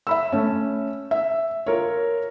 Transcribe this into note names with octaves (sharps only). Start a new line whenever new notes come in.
E5 B5 E6
A3 C#4
E5
F4 A#4 C#5